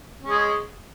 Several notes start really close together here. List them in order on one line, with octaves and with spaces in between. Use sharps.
C#4 G#3 G#4